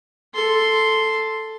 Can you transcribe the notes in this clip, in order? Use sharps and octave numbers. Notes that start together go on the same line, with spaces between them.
A4 C6